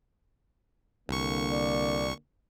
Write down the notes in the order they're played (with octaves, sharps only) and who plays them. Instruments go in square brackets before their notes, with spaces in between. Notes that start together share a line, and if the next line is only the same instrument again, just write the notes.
[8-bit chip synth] C2 C#6 [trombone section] D3 A#3
[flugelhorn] D5